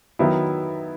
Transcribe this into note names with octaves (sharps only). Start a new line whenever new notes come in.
D#3 F#3 B3 E4